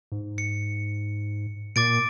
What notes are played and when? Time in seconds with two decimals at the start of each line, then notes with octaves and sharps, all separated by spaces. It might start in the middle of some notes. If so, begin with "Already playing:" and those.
0.12 G#2
0.38 C#7
1.76 A#2 D6 A6 D7